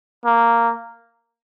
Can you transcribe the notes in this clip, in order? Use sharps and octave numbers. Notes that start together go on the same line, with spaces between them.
A#3